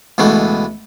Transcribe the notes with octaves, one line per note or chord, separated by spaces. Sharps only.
C#2 B2 E3 A3